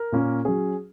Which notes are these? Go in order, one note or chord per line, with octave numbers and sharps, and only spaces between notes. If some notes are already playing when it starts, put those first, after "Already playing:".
Already playing: A#4
A#2 A#3 C#4
F#3 C#4 G#4